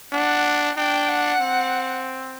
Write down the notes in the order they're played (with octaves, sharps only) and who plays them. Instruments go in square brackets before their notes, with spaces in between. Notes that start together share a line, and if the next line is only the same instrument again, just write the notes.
[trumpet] D4 [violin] F#5
[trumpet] D4 [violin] G5
[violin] F#5
[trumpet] C4